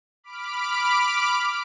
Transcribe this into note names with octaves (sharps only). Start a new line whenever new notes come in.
B5 D6 F6 B6 D7